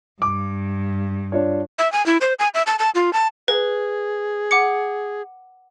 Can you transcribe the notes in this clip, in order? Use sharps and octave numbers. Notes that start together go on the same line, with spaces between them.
G2 D6
D4 F4 C#5
E5
G#5
E4
C5
G#5
E5
A5
A5
F4
A5
G#4 B4
F#5 D6 C#7